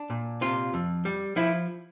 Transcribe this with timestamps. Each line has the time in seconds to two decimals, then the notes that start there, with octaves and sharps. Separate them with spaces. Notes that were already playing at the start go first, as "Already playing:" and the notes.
Already playing: D4
0.10 A#2
0.41 C3 F4
0.74 F2
1.05 G3
1.36 F3 E4